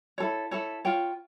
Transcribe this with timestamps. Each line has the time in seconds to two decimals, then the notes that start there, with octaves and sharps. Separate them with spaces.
0.18 E4 A4 C#5
0.51 E4 A4 C#5
0.85 F4 C#5 G5